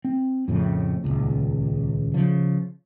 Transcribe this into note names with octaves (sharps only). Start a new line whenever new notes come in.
C4
F2 A2 C#3
D#1 G#1 C#2
C#3 F3